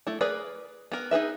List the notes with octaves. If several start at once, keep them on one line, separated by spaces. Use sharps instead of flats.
A3 E4
G#4 A#4 B4 D5
B3 A#4
D#4 G#4 B4 E5